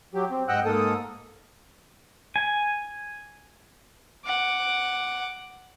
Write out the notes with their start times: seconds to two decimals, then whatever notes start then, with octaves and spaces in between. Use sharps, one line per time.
0.14 F#3 G4
0.31 C4
0.48 G#2 D#5 F#5 G5 E6 F#6
0.65 G#2 A#3 A4 D#6
2.36 G#5
4.25 F#5 D6